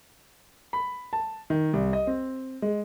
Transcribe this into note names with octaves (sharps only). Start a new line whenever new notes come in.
B5
A5
D#3
C2
D#5
C4
G#3